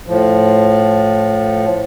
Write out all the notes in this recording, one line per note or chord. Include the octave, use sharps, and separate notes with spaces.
A2 F3